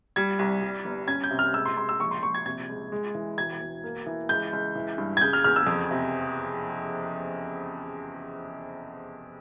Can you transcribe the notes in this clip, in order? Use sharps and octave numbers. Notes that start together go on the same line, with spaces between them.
G3 G#6
C2
G3
G1
C#4 G#6
G6
C3
F6
C#2 E6
C6
C#2 C6
E6
A#1 C#6
C6
A#1 C#6
G#6
C3 G#6
C#2
G#3
E3
E1 G#6
E1
A#3
E3
C#2 G6
C#2
E3
G2
G#6
C#3 G6
F6
E2 F6
E6
F2
C3